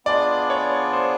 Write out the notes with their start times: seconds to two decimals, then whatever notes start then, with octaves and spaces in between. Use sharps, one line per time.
0.06 B3 D4 F4 G#4 D5
0.50 C#5
0.93 C5